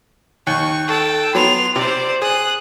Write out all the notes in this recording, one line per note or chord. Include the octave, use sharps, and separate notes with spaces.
D#2 C#6
A4 G5
F#3 B3 C6 F7
C3 C5 D5
G#4 D#6 F#6